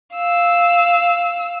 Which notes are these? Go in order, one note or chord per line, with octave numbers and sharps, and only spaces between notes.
F5 E6